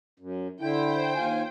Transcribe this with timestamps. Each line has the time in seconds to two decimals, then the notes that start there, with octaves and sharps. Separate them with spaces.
0.20 F#2
0.60 D3 E4 C5 G5
1.15 D#2 F4 G#5